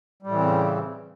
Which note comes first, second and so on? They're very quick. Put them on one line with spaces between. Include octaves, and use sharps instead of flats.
G3 A2 E3 C4 C#3